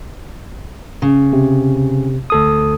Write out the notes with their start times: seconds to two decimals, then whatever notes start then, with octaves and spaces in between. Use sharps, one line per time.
1.02 C#3
1.33 C3
2.30 D2 A4 D#6